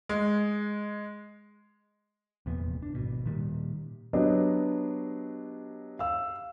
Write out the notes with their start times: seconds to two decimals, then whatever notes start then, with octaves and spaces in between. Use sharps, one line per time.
0.09 G#3
2.46 F1 E2 A#2 B3
2.83 D4
2.95 G#1 B2
3.26 A#2 D#3 G3
4.13 F#3 B3 D4 G4 D#5
5.99 F5 E6